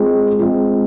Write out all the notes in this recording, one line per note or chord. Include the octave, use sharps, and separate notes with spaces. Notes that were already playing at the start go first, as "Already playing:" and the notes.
Already playing: G#3 C4 F4 G#4
G#3 C4 F4